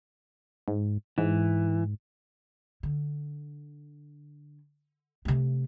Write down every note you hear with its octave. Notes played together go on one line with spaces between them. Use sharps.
G#2
G#2 E3
D3
C3 A3